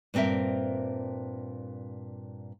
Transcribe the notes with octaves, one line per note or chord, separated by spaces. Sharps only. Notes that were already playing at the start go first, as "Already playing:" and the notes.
G2 A#2 C4 A#4 E5